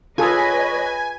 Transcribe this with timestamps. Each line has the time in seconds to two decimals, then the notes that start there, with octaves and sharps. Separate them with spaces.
0.18 F4 G#4 A4 B4 C#5 D#5 G#5